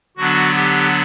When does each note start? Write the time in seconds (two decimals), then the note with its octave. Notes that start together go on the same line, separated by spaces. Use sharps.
0.17 D3 F#3 B3 D4 F#4
0.56 G4